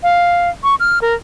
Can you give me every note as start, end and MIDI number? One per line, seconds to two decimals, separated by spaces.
0.03 0.49 77
0.64 0.75 85
0.80 0.99 89
1.02 1.14 70